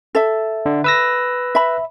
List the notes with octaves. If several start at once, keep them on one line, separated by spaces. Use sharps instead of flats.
A4 E5
D3
B4 E6 A#6
E5 B5